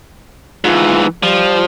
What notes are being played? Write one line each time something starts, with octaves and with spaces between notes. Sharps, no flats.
G#2 E3 F4
F3 G3